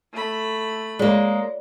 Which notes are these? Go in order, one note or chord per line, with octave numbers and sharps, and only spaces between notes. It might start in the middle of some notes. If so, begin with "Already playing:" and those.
A3 B5
G#3 A#3 F4 C#5 D5